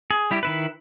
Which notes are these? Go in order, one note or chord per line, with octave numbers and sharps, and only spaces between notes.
G#4
G3 E4 G4
D#3 E4 B4